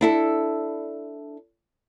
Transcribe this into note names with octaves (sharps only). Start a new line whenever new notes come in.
D4 E4 A4